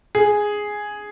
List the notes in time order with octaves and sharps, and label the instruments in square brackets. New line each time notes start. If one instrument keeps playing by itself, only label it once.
[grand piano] G#4